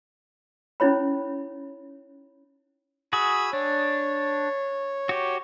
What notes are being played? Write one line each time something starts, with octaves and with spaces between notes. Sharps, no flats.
C#4 D#4 E4 C#5 B5
F#4 G#4 B5 E6
D4 C#5
F#4 G4